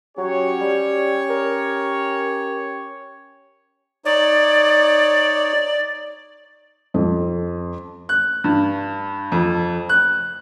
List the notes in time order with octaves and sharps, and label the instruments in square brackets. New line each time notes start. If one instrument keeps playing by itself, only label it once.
[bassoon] F#3 [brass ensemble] C#4 G4 C#5
[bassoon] G3
A#4
[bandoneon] D#4 C#5 [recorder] D5
[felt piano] F2
[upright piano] F#6
G2
F2
F#6